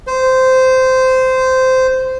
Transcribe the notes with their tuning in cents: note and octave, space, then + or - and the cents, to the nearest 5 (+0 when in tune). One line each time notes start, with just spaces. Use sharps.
C5 -15